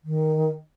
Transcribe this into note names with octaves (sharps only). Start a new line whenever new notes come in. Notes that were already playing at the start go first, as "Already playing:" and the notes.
D#3